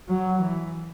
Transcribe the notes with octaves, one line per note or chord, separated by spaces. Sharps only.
F#3
E3